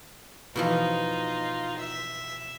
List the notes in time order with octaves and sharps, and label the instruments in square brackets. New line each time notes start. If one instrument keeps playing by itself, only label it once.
[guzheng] B2 E3 F3 [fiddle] D#4 F4
[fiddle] E5